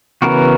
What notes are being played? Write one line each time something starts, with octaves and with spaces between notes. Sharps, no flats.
C#3 E3 B3 F#4 A#4